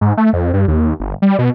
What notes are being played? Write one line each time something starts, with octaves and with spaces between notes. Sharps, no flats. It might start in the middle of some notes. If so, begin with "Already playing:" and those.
G#2
A3
F2
G2
D#2
G1
G3
B2